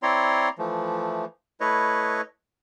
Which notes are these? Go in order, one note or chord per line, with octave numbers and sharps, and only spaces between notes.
C4 E4 C#5 D5 A#5 C6
E3 F3 A3
A3 E4 B4 C#5 D#5